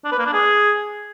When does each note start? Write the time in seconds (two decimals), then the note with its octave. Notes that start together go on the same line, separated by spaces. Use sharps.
0.05 D4
0.12 B4
0.19 A#3
0.26 D4
0.34 G#4